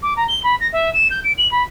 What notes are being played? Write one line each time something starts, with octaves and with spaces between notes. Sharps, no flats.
D6
A#5
G7
B5
A#6
E5
E7
G6
D7
F#7
B5